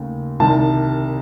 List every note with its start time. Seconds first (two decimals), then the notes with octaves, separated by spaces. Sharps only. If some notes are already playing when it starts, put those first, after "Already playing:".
Already playing: D#2 C#3 A3
0.40 C2 C3 D#3 A5